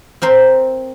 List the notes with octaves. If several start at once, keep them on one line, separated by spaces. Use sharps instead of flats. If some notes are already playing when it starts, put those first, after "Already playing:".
C4 A#4 C5